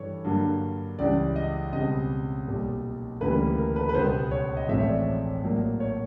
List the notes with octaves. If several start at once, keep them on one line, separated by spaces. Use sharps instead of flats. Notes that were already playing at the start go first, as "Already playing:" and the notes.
Already playing: G2 E3 G3 A4 C#5
G2 D3 F#3 A#3
C#2 C#3 E3 G3 D5
D#5
C#2 B2 G3 C4 D#5
B1 A#2 G3
D2 C#3 E3 G3 A#3 B4
A#4
B4
B4
C#2 B2 G3 B3 C5
C#5
D#5
A1 A2 F3 G#3 C4 E5
C#5
D5
A#1 A2 F#3 A#3
C#5